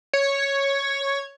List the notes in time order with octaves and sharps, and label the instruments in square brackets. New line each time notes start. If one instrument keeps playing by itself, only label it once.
[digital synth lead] C#5